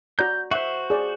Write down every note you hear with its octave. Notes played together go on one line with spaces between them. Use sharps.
F#4 D5 A#5 G6
F#4 C5 E5
G#4 D5